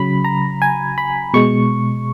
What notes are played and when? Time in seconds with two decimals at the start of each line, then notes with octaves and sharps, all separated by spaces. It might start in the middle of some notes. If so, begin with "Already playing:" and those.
Already playing: C#3 F#3 B5
0.25 A#5
0.62 G#5
0.98 B5
1.34 B2 G#3 C#6